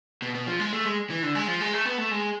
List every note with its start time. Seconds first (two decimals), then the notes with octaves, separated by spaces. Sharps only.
0.22 B2
0.35 B2
0.47 F3
0.60 G#3
0.73 A3
0.85 G#3
1.10 E3
1.23 D3
1.35 G#3
1.48 F3
1.61 G#3
1.73 A3
1.85 B3
1.98 A3
2.11 G#3